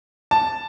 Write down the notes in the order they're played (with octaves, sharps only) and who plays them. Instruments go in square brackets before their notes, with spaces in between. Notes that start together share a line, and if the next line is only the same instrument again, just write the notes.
[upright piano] A5